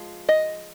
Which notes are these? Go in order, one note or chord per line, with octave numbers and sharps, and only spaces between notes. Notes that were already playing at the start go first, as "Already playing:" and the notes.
Already playing: F3 G#3
D#5